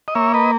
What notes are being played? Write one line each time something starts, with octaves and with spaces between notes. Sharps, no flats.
D#5
A#3 C#5 E5
B4 D#5